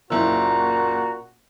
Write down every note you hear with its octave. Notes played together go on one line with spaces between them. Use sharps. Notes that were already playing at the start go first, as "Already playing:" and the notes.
F#1 A#2 E4 F#4 A#5 E6